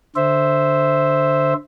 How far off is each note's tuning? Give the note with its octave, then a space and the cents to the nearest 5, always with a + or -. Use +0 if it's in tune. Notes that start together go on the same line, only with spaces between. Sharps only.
D3 +0 C5 +0 E5 +0